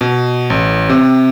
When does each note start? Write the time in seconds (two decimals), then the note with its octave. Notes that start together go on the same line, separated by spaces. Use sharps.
0.01 B2
0.50 A1
0.89 C3